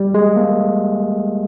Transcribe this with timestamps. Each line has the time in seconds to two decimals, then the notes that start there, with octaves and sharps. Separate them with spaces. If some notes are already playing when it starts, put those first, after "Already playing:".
Already playing: G3
0.14 G#3
0.36 A#3